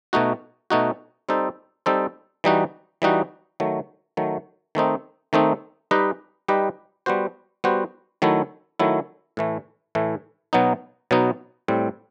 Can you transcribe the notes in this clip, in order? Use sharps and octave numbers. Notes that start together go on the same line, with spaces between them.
B2 A3 D#4 F#4
B2 A3 D#4 F#4
G3 C4 D#4 A4 C5
G3 C4 D#4 A4 C5
E3 G3 D#4 F#4
E3 G3 D#4 F#4
D#3 F#3 A3
D#3 F#3 A3
D#3 A3 C4 D#4
D#3 A3 C4 D#4
G3 D#4 G4 B4 D#5
G3 D#4 G4 B4 D#5
G3 B3 F#4 C5
G3 B3 F#4 C5
D#3 F#3 A3 E4
D#3 F#3 A3 E4
A2 E3 A3
A2 E3 A3
B2 F#3 B3 D#4
B2 F#3 B3 D#4
A2 G3 C4